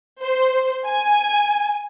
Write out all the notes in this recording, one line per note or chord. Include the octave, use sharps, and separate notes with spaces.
C5
G#5